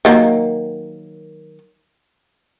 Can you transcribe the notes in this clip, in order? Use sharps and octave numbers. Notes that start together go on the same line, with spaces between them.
D#3 F#3 A#3